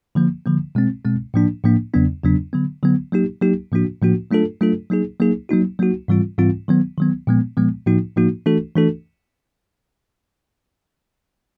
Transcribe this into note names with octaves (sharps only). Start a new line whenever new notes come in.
D3 F3 A#3
D3 F3 A#3
B2 G#3 C4
B2 G#3 C4
A2 F3 A#3 D4
A2 F3 A#3 D4
E2 C#3 F#3 B3 D4
E2 C#3 F#3 B3 D4
D3 F#3 B3
D3 F#3 B3
F#3 A#3 D#4 G4
F#3 A#3 D#4 G4
A2 F3 A#3 D4 F#4
A2 F3 A#3 D4 F#4
F#3 A3 D4 F4 A4
F#3 A3 D4 F4 A4
F#3 A#3 D#4 G#4
F#3 A#3 D#4 G#4
F#3 A#3 D#4 F#4
F#3 A#3 D#4 F#4
G#2 E3 G3 C4 F4
G#2 E3 G3 C4 F4
D#3 F#3 B3
D#3 F#3 B3
A#2 F3 G#3 B3
A#2 F3 G#3 B3
A2 F3 A#3 D#4 F#4
A2 F3 A#3 D#4 F#4
E3 A3 D4 F#4 A4
E3 A3 D4 F#4 A4